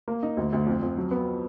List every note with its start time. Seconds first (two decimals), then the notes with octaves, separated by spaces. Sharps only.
0.08 A#3
0.23 D#4
0.37 D2
0.53 D2
0.67 F2
0.82 F2
0.97 F#3
1.11 B3